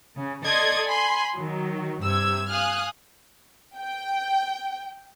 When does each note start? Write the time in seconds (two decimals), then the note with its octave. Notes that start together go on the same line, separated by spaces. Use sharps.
0.16 C#3
0.45 A4 D5 D#5 C6 D#6 G#6
0.88 G#5 B5 C6
1.34 D#3 F#3
2.02 G2 C3 E6 G#6
2.49 F5 G#5 D#6 F6 F#6
3.77 G5